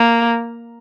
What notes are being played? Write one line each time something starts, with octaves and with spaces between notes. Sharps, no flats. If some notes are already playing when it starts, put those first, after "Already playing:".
Already playing: A#3